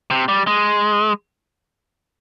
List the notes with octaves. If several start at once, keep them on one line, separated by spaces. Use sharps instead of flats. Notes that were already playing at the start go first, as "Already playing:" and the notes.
C3
G3
G#3